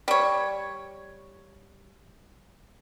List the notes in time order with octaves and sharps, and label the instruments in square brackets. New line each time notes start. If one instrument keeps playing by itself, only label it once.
[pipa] G3 C#5